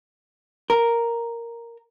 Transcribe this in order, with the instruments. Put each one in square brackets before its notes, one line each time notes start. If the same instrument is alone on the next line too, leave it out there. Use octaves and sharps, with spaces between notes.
[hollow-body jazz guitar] A#4